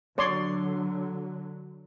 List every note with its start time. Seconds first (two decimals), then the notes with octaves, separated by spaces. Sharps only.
0.18 D3 F#3 C#5 D5 C6